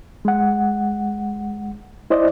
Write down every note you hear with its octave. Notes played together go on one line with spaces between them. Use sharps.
G#3 F#5
E4 C5 D5 D#5